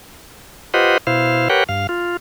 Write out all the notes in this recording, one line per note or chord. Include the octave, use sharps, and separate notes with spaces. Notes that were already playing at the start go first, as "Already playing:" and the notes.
F4 G4 B4 C5 D#5 F#5
B2 E4 C5 F5
G4 A#4 B4 C#5 F#5 G5
G2 F5
F4